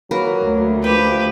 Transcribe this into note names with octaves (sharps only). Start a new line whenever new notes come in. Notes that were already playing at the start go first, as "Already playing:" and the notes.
F#3 A#3 A#4 B4
D2
F3 G4 B4 G5